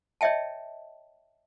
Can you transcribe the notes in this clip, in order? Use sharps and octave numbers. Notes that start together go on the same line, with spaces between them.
C#5 D#5 E5 G5 A5